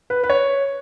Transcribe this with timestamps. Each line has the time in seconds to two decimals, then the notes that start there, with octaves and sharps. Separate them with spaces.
0.10 B4
0.24 B4
0.30 C#5